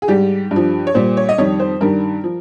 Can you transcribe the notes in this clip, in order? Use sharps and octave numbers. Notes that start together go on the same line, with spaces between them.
G#4
G#2 G3 G4
G2
F3
C#5
A#2 G3 C5
C#5
D#5
F2 D#3 G3 C#5
C5
G2 D#3 G3 A#4
F3